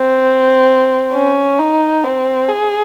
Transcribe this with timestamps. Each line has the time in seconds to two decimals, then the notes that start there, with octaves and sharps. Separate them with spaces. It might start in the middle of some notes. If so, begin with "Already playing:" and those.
Already playing: C4
1.14 C#4
1.59 D#4
2.04 C4
2.49 G#4